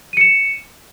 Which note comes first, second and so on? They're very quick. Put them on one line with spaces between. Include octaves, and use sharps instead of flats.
D#7 C#7 E7